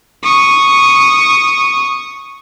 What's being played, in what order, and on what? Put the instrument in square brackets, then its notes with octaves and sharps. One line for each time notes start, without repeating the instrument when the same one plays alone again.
[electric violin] C#6 D#6